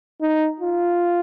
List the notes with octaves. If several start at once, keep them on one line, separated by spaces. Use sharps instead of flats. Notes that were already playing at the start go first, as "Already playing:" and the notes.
D#4
F4